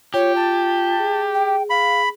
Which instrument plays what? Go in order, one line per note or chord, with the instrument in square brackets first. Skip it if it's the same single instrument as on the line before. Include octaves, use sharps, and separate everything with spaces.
[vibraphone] F4 [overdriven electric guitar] G4 [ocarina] C#5
[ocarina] A5
[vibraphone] G#4
[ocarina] G5
[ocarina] F5 [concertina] B5